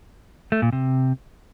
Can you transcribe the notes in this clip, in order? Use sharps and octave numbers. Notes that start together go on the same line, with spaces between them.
A3
A#2
C3